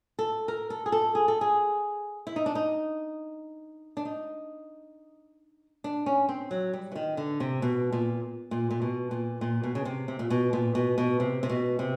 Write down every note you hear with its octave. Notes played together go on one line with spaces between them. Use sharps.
A4
A#4
A4
G#4
A4
G#4
A4
G#4
E4
D#4
D4
D#4
D4
D#4
D4
C#4
C4
F#3
G3
E3
D#3
D3
C3
B2
A#2
A#2
A#2
B2
A#2
A#2
B2
C#3
C3
C3
A#2
B2
A#2
B2
B2
C3
C3
B2
C3